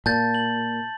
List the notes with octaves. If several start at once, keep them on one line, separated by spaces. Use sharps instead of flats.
A#2 A5 G6 A6
F#7